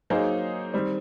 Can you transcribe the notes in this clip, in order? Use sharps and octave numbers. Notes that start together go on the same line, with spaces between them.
F#3 A#3 D#4 G#4 C5
D#3 G3 C4